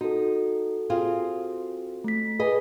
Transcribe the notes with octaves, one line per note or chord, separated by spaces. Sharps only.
D#4 F#4 A4
C4 F4 G#4
A3 B6
G#4 B4 D#5 G#5